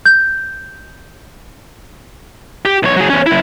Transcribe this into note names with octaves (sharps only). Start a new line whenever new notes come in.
G6
G4
B1 C#5
F#3 G#4
E2 C#4
F#2 E4